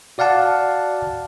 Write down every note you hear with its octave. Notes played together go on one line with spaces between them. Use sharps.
F#4 D5 F5 F#5 A5